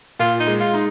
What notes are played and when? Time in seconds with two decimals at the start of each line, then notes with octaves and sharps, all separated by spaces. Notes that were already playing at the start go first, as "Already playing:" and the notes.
0.19 A#2 F4
0.40 D#4
0.47 G#3
0.60 F4
0.74 D#4